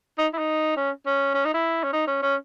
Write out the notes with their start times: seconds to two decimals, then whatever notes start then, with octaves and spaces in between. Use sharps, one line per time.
0.19 D#4
0.34 E4
0.38 D#4
0.77 C#4
1.06 C#4
1.34 C#4
1.45 D#4
1.54 E4
1.84 C#4
1.93 D#4
2.07 C#4
2.23 C#4